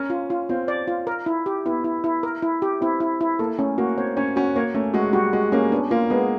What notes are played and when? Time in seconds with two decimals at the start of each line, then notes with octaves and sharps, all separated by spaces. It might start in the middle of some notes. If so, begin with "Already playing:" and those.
Already playing: C#4 A#4
0.10 F4
0.30 F4
0.49 C4 F4
0.68 D5
0.87 F4
1.07 A#4
1.26 E4
1.46 G4
1.66 B3 E4
1.84 E4
2.04 E4
2.23 A#4
2.42 E4
2.62 G4
2.81 C4 E4
3.00 E4
3.21 E4
3.39 A#3 A4
3.59 A3 C#4
3.78 A#3 F#4
3.98 C4 C#5
4.17 C#4 C#5
4.36 C#4 F#4
4.56 A#3 C#5
4.74 A3 C#4
4.94 G#3 F#4
5.13 G3 F#4
5.33 G#3 F#4
5.52 A#3 C#4
5.72 B3 D4
5.91 A#3 F4
6.10 G#3 B3